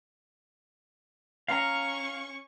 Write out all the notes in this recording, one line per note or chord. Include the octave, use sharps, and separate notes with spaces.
C#4 F5 A#5 C#6